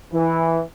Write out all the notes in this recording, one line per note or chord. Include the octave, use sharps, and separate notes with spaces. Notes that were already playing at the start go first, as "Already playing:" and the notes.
E3